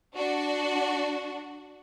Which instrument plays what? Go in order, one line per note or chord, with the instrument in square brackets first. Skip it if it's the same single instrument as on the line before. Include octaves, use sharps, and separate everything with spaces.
[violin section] D4 F#4